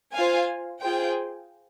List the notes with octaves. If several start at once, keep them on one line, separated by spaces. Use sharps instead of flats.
F4 C5 F5 G#5
F4 G#4 C5 G5